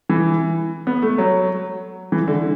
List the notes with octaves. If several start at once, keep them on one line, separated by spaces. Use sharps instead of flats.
E3
B3
A3
F#3
E3
D3